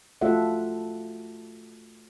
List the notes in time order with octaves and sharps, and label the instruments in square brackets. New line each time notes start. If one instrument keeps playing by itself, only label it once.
[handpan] A3 F4 F#4 A4 E5 F#5